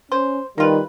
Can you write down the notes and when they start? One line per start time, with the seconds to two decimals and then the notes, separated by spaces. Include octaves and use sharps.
0.12 C#4 C5
0.58 D#3 G3 A#3 F4 B4